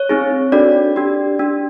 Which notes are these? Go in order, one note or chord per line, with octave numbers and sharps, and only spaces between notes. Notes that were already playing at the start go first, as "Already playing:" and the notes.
Already playing: C#5
C4 D#4 G#4
D4 F#4 A4 D5
D4 G4
D4 G4